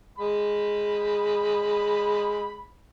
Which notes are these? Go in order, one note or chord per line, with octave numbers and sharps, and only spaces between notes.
G#3 B5